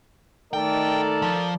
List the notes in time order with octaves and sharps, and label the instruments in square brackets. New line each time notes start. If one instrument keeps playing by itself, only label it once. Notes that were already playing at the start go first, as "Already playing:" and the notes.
[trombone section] D#3 A3 D#4 [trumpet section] A4 A#4 D5 [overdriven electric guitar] G5
[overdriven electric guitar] F3